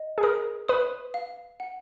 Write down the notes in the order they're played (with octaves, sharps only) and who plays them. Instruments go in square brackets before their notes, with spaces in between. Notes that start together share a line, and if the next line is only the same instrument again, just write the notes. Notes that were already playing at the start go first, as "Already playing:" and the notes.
Already playing: [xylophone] D#5
[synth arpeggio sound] G#4
[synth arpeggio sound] A#4 [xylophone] D#6
[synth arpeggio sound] B4 [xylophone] D#6
[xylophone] F5
F#5